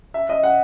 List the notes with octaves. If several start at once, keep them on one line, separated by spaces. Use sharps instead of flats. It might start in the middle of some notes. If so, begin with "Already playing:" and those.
E5
D#5
F#5